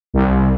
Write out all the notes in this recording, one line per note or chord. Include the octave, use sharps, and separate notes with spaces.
C2